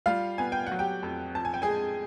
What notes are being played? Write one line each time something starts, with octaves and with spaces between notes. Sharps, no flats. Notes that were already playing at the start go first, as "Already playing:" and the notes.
G3 F4 F5
B3 G#5
G5
F#5
F#3
G4 G5
F2
F3 A5
G#5
G5
G#4 G#5
G#3